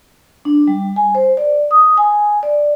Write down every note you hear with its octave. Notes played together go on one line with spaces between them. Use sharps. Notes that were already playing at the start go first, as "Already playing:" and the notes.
D4
G3
G#5
C5
D5
D#6
G#5
D5